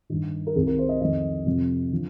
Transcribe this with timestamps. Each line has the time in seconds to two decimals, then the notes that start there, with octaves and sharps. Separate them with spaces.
0.10 G2 D#3
0.47 A#4
0.55 C2 C3 D#3 G#4
0.67 A#4
0.78 C5
0.89 D#5
1.01 F2 D#3 D#5
1.46 F2 C3 F3
1.92 D3 F3